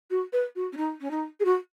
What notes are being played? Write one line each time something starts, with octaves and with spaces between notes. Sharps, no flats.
F#4
B4
F#4
C#4
D#4
C#4
D#4
G#4
F#4